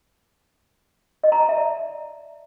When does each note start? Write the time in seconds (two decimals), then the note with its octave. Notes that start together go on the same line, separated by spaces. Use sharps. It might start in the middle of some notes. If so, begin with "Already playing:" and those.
1.24 D#5
1.32 A#5
1.40 A5
1.49 E5
1.57 D5